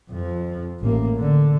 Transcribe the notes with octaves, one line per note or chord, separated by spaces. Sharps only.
F2 F3
A1 A#3
D3